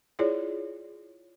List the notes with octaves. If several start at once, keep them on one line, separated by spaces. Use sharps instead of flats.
E4 F4 G#4 C#5 D5